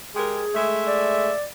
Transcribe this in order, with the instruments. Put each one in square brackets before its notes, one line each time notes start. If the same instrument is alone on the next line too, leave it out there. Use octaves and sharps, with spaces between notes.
[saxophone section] G#3 G4 A#4 [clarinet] G#4
[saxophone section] G#3 A3 E5
[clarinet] D5